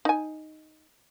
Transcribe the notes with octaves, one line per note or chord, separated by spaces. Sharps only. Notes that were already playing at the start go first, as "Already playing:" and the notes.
D#4 G#5